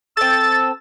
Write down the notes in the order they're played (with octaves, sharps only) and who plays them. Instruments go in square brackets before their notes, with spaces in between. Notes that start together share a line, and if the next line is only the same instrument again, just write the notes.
[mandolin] C4 A4 [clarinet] E6 [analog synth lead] A6